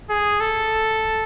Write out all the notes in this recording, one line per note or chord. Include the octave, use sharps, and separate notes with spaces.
G#4
A4